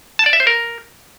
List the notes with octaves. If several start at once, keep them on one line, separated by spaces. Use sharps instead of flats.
A5
D5
E5
C5
A#4